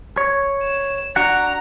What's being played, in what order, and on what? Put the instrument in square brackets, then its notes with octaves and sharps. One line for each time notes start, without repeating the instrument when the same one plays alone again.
[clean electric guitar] C#5
[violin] E7
[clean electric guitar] D4 F#4 F#5 [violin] A#5